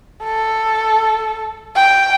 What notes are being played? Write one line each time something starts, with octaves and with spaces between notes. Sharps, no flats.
A4
G5